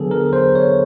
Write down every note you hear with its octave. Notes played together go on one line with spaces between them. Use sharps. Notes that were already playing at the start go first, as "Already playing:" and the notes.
Already playing: D3 F#3 B3 G#4 A4
A#4
C5
C#5